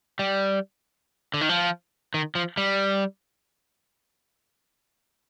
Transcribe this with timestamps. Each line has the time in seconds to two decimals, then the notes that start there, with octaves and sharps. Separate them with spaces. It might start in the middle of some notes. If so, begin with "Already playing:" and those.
0.19 G3
1.34 D3
1.41 D#3
1.49 F3
2.14 D#3
2.35 F3
2.57 G3